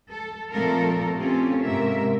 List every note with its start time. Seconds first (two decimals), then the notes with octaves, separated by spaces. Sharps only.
0.12 A4
0.52 A#2 F3 A3 C4 A4 A#4
1.19 C4 C#4 F4 G4 A4
1.61 G#2 C3 A#3 A#4 E5